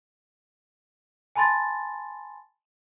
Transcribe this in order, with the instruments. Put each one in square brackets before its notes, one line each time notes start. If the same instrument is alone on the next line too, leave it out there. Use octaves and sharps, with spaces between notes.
[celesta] G#5 A5 B5 C6 A6